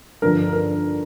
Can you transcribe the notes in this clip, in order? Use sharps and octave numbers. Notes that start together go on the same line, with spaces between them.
G2 D3 F3 A#4
A#4